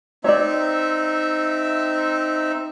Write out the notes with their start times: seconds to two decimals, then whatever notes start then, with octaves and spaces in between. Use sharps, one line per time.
0.24 C4 D#4 C#5 D5 E5